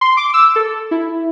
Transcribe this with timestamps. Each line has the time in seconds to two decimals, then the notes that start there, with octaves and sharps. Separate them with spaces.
0.01 C6
0.17 D6
0.34 E6
0.56 A4
0.91 E4